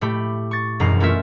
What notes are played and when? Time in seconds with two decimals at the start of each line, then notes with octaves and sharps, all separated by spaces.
0.01 A2 A3 G4 B5
0.51 C#6 A6
0.80 E1 F#2 E3 A#5 C7
1.00 A3 C#4 F4 A#4 E5